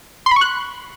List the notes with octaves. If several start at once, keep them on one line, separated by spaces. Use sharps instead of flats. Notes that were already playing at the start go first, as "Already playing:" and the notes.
C6
B5
C#6
F#6